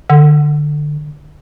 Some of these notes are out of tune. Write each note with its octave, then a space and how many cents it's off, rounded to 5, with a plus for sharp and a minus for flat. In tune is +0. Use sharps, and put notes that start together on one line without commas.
D3 +20